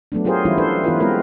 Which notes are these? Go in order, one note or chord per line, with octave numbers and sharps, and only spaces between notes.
F#3 A3 B3 D4
F#3 F4 G4 G#4 A#4 C5
E3 G3 C#4 E4 F4
D4 A4 B4 C5
E3 B3 E4 F4 B4
G#3 B3 C4 F4 A#4 B4